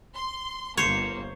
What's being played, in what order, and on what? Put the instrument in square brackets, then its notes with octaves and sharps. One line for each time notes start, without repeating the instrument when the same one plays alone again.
[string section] C6
[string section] G1 A#3 [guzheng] C5 C#5